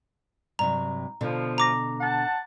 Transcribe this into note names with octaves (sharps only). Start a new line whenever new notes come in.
G2 C3 F#3 A#5
B2 D3 F3
A#5 D6 A#6
F#5 A5